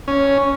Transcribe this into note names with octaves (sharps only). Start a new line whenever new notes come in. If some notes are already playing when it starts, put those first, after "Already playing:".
C#4